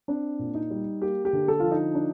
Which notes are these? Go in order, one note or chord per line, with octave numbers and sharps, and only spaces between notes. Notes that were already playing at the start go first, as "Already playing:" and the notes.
C4 D4
A#2
D#4
G3
A#3 G4
G4
D3
A4
F3 F4
D#4
D4